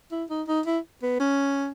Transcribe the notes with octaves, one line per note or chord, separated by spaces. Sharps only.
E4
D#4
D#4
E4
B3
C#4